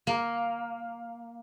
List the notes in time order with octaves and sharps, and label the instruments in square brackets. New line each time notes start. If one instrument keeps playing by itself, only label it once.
[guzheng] A#3